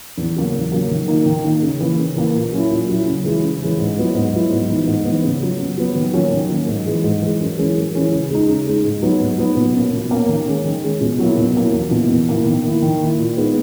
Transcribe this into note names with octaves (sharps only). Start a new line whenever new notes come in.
E2
C#3 F#3 A#3
E2
C#3 F#3 A#3
D#3
A#3 D#4
D#3
A#3 D#4
C#3
E3 A#3
C#3
E3 A#3
A#2
F#3 C#4 E4
A#2
F#3 C#4 E4
C#3
E3 G#3 C#4 E4
C#3
E3 G#3 C#4 E4
G#2
F#3 B3 E4
G#2
F#3 B3 E4
G#2
E3 B3 D#4
G#2
E3 B3 D#4
C#3
F#3 B3
C#3
F#3 B3
D#3
F#3 A#3 C#4
D#3
F#3 A#3 C#4
G#2
E3 G#3
G#2
E3 G#3
F#2
E3 G#3 C#4 E4
F#2
E3 G#3 C#4 E4
C#3
G#3 D#4
C#3
G#3 D#4
G#2
F#3 B3 D#4
G#2
F#3 B3 D#4
B2
A#3 C#4
B2
A#3 C#4
D#3
G#3 C#4
D#3
G#3 C#4
B2
F#3 A#3 E4
B2
F#3 A#3 E4
E2
B2 A#3 E4
E2
B2 A#3 E4
D#3
A#3 E4
D#3
A#3 E4
A#2
G#3 B3 D#4